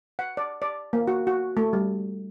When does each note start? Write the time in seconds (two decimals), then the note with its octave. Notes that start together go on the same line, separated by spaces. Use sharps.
0.19 F#5
0.37 D5
0.62 D5
0.93 A#3
1.08 F#4
1.27 F#4
1.57 A3
1.73 G3